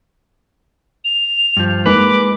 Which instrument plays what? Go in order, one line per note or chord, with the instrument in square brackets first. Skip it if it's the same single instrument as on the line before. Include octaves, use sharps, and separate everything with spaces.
[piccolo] F7
[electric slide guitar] G2 F3
[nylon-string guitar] G#3 A#3 D#4 [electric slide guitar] B4 [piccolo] D6